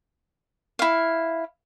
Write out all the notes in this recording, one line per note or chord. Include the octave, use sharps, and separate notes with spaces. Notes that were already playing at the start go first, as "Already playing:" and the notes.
E4 F5